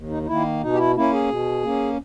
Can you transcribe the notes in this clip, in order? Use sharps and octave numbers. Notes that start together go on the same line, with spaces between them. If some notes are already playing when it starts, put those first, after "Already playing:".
Already playing: D#2
D#4
D#4
D#3 A#3 E4
B2 D#4
G4
E4
A#3 C#4 E4
G#4
B2
A#3 C#4